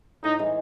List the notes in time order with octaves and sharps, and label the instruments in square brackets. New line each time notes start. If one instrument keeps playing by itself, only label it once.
[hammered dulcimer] A2 [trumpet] D#4
[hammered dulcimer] E3 G#3 D#4